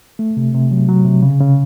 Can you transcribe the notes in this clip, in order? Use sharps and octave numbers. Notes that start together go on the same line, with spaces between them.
A3
C3
C3
F#3
F#3
C3
C#3
C#3